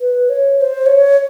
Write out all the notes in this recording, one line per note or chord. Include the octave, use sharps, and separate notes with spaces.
B4
C#5
C#5
C5
C#5